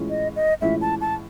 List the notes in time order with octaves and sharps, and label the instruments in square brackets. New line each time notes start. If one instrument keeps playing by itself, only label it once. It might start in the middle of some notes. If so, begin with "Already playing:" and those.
Already playing: [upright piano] A2 E3 G#3 C#4 F4
[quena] D#5
D#5
[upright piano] A2 E3 G#3 C#4 F4 [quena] E5
[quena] A5
A5